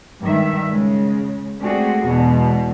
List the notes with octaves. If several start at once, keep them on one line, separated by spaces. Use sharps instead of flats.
G2 D#3 G#3 E5
C#3 G#3
G#3 A3 C4 D4 F#4 G#4
E2 B2 G#3